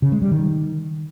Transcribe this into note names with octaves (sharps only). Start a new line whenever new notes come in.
C#3
G#3
G3
D#3